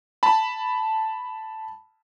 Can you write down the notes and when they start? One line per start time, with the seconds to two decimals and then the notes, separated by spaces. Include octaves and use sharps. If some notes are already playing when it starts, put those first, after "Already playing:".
0.23 A5 B5